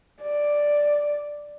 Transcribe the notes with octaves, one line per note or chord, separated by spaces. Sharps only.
D5